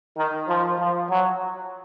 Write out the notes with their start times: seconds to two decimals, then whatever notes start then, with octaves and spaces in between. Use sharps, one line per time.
0.18 D#3
0.48 F3
0.79 F3
1.10 F#3